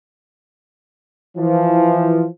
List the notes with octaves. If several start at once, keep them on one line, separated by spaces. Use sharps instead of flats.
E3 F3